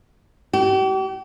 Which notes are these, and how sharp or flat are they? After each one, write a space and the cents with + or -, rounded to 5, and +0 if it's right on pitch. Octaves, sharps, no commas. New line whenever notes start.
G4 -40